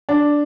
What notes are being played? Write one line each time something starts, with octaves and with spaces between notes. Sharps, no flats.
D4